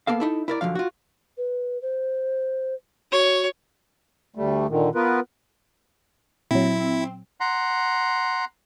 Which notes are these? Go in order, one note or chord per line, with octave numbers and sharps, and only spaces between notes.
A#3 B3 A4 F5
D#4 E4 A4
E4 A#4 D5
F#2 D3 F3 F5
F4 F#4
B4
C5
F#4 C#5
D2 G3 A3
A#2 D3 D#3
B3 F4 A#4 B4
A#2 F#3 C4 E4
F#5 A#5 C6